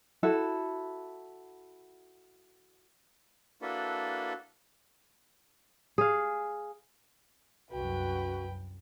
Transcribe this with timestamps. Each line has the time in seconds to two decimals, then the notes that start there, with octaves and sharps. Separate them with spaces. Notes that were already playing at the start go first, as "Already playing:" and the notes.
0.23 E4 F#4 A4
3.62 A#3 D4 E4 F#4 A4 B4
5.98 G#4 F5
7.71 C2 F#2 F#4 B4 G5